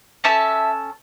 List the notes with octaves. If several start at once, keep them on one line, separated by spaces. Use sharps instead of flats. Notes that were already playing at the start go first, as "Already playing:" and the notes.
C#4 A4 E5 A5